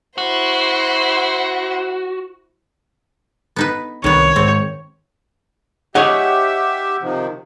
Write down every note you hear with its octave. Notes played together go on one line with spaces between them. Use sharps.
E4 F#4 C5
B3 D#4 B4
C2 D#3 B3 C#5
G#2 C4
D#4 G4 G#4 C#5 E5 F#5
C3 D#3 F3